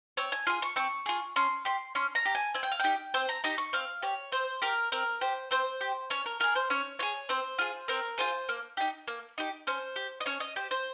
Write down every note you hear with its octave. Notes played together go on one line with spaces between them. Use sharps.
C4 C#5
G#5
F4 G#4 C6
C#6
C4 C#6
F4 G#4
C#4 C6
G4 C6
C#4 C6
A#5
G4
G#5
C4 G#5
G5
F5
D#4 G4 G5
C4 C5
A#5
D#4 G4 A#5
C#6
C4 F5
G4 C#5
C4 C5
G4 A#4
C4 A#4
G4 C5
C4 C5
G4
C#4 C#5
A#4
F4 G#4 A#4
C5
C#4 C#5
F4 G#4 C#5
C4 C5
F4 G#4
C4 A#4
F4 G#4 C5
A#3
D#4 G4
A#3
D#4 G4
C#4 C5
G4
D#5
C#4 C#5
D#5
G4 C5
C5